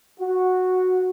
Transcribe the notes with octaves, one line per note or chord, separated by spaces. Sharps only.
F#4